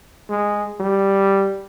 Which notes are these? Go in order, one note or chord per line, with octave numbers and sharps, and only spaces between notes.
G#3
G3